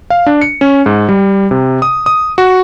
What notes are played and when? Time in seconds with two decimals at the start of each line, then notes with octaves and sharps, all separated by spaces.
0.10 F5
0.26 D4
0.41 C#7
0.61 C#4
0.86 G#2
1.09 G3
1.51 C3
1.82 D#6
2.06 D#6
2.38 F#4